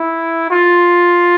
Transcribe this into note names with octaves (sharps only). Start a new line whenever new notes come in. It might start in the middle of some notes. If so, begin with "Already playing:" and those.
Already playing: E4
F4